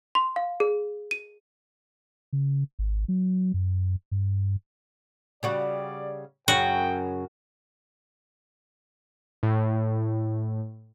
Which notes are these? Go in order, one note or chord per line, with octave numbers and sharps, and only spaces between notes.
C6
F5
G#4
D#7
C#3
G#1
F#3
F#2
G2
C#3 G3 F#4 D5
F#2 C#3 C#4 F#4 G5
A2